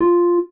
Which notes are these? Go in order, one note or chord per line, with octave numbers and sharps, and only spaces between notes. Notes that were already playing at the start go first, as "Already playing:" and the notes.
F4